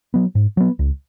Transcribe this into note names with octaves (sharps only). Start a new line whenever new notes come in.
F#3 B3
G#2
F#3 B3
C#2